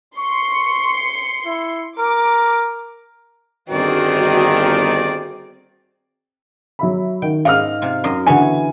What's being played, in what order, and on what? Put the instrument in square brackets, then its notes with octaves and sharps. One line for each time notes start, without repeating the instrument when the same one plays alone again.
[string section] C6 C#7 [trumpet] C#6
[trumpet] E4
[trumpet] A#4 [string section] D6
[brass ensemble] G1 D#3 [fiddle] C4 G#4 [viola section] F#4 [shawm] D5
[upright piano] F#3 E5 B5
[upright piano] D#3 [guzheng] G5
[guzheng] G#2 D#5 [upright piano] F5 F6
[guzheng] C3 F4
F#2 D#5 C6
[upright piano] D3 G#5 [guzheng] E3 B3 C#5